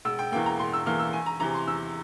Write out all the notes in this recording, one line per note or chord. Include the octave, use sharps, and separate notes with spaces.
E1 E6
G5
E2 E3 A#3 G5
A#5
E1 C6
E6
E2 E3 A#3 F6
E6
E2 G#5
A#5
C3 E3 A#5
C6
E2 E6